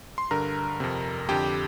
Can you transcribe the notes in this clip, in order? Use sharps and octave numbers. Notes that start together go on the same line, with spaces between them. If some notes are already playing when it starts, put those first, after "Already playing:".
C6
G2 D3 A#4 A#5
F2 C3
F2 D3 G4 G5